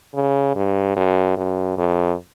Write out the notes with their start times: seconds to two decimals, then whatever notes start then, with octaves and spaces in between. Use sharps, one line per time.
0.14 C#3
0.55 G2
0.96 F#2
1.37 F#2
1.77 F2